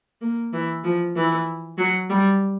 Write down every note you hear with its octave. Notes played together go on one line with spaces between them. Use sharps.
A#3
E3
F3
E3
F#3
G3